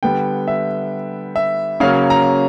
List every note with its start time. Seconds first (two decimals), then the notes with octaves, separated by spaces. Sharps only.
0.03 D3 G3 B3 G5
0.48 E5
1.36 E5
1.80 C#3 F#3 A#3 C#4 F5
2.10 A#5